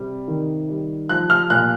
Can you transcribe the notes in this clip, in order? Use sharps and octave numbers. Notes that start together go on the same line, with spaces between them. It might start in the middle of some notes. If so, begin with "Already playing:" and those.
Already playing: C3 G3
D#3
G3
F3 F#6
F6
A#2 F#6